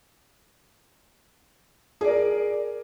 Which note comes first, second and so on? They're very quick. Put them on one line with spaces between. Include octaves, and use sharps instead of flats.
G#4 D5 A#4